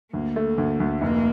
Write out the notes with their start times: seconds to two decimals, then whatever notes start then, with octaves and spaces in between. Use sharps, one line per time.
0.13 D2 A#3
0.36 A3
0.58 D2
0.80 D2
1.01 F1 A#3